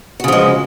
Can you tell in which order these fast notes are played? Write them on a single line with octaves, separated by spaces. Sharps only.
F#4 C#3 F3 G#3